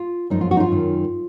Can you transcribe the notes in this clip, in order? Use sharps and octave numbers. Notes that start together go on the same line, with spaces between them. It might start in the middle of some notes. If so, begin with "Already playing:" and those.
Already playing: F4
F#2 F3 D#4
F4
F#4
D#4
F4
F#2 D#3